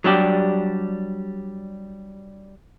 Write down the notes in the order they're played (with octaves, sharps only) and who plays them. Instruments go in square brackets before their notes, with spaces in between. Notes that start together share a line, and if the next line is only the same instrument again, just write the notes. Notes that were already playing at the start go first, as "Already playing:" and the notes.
[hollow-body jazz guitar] F#3 G3 D4 G4